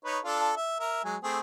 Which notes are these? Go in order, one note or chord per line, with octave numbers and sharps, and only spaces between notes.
D#4 B4 C#5
D4 F4 A4
E5
A#4 E5
F#3 G#3 G#5
A3 C4 G#4